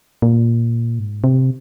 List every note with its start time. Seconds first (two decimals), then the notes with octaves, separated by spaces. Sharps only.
0.22 A#2
0.99 G#2
1.24 C3